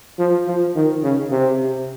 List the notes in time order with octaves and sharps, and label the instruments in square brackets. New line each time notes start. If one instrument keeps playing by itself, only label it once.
[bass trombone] F3
F3
D#3
C#3
C3